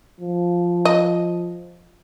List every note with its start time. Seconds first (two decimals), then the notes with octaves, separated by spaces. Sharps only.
0.20 F3
0.85 D#5